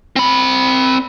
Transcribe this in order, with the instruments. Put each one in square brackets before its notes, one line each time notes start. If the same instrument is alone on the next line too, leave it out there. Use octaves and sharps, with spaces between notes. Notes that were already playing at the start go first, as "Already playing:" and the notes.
[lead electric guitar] C4 B5